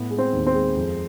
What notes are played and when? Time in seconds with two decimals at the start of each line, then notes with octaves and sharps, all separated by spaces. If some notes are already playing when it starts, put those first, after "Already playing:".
Already playing: A2 B3
0.11 G#3
0.18 C4
0.33 D#2
0.47 C4
0.55 G#3
0.76 F2